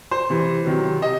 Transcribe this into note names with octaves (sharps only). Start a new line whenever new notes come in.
C5
C3 E3
C3 D#3 F#3
C3 D#5